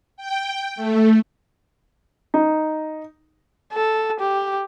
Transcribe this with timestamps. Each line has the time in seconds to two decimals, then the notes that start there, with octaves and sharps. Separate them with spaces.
0.17 G5
0.75 A3
2.34 D#4
3.73 A4
4.20 G4